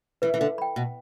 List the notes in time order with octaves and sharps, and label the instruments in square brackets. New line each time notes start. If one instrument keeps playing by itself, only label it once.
[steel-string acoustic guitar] E3 [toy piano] B4
[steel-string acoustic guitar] E3
D3
[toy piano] G5 B5
[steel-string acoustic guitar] B2